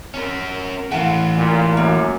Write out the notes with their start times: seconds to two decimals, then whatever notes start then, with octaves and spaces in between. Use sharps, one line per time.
0.14 C#4 A#4
0.92 E3 A3 F5 F#5
1.37 A#2
1.77 F#2 A#3